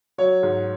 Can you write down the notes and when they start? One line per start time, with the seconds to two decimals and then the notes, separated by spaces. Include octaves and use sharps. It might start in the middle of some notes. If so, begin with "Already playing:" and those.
0.18 F#3 C#5
0.43 G#2